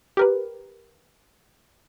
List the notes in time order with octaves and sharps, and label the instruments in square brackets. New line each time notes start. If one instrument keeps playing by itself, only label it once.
[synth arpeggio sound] G4 A#4 B4